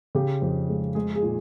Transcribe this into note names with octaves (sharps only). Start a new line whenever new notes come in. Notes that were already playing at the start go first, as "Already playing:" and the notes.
C#3 G4
F2
G#3
G#3 G#4
G#4
A#2